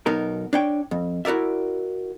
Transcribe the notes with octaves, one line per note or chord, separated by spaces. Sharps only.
B1 B2 B3 D#4 A#4
D4 C#5 G5
F2
E4 F#4 A#4 D5 E5